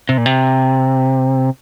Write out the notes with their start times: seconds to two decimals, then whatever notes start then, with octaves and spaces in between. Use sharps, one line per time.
0.09 C3
0.18 A#2
0.26 C3